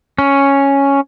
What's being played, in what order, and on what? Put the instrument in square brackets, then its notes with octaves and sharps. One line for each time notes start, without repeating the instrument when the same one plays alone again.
[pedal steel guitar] C#4